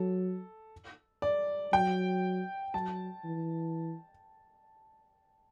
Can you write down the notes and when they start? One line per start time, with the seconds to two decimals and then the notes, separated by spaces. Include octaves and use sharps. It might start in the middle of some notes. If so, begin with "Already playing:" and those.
Already playing: F#3 A4
1.22 D5
1.73 F#3 G5
2.74 F#3 A5
3.24 E3